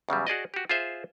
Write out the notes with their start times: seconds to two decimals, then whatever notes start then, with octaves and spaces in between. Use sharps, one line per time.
0.09 E2 C#3 F#3 G3
0.27 F#4 G#4 D5 D#5
0.54 F#4 G4
0.69 F4 G#4 C5 E5